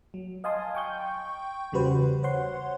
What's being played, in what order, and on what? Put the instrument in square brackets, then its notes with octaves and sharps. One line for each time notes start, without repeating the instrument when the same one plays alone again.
[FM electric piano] F#3
D#5 F5 G#5 A5 C6 D#6
G5 C#6 G6
E2 C#3 G3 F#4 B4 C5
C5 C#5 F#5 C6